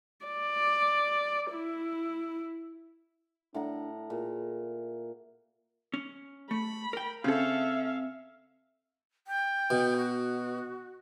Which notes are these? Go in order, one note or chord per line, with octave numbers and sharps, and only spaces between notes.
D5
E4
A2 D4 F#5 A#5
A#2 G#4
C#4
A3 B5
A#4 G5
C#3 C4 A4 E5 F5
G5
B2
F#4